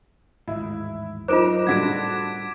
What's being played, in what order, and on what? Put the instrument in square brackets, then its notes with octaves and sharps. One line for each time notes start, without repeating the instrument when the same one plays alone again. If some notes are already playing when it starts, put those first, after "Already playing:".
[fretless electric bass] A1 D#2 G#2 [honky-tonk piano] E4
[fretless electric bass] F#2 [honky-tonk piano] D#4 A#4 [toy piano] F4 C5 [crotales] D6 D7 E7
[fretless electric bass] A2 G3 [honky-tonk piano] D3 F#4 [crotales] G#6 B6 D7